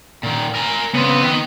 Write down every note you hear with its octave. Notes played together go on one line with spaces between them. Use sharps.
A#2 D#3
A#4 G#5
C#3 B3 C4
D#3 D#5